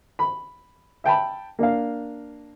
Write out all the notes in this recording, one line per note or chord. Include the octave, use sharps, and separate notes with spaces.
B5
E5 G5 A5 B5
A#3 D4 F5